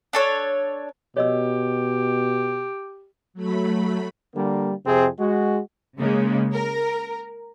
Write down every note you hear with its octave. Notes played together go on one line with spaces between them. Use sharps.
D4 A4 C#5
B2 G4 C#5 D#5 E6
F#3 A3 B5
D3 G3 A#3
F2 C3 C4 G#4
G#3 F#4
C#3 G#3 A#3
A#4